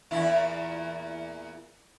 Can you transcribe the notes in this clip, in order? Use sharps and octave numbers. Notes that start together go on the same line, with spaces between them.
E2 A#2 E4